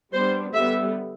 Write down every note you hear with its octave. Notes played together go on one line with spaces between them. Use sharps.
G3 B3 D4 C5
D3 G3 B3 E5